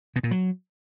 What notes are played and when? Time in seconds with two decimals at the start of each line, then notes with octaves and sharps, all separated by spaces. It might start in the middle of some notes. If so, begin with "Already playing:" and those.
0.16 B2
0.23 A#2
0.31 F#3